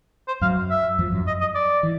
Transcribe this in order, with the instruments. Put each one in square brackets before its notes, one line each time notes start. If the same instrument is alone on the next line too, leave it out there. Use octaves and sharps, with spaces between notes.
[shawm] C5
[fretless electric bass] F#2 F#3 [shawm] F5
[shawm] E5
[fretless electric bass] F2 F3
F#2 F#3
[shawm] D#5
D#5
D5
[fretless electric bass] E3